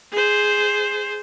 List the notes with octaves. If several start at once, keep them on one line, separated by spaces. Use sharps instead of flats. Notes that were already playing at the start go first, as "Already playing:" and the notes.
G#4 C5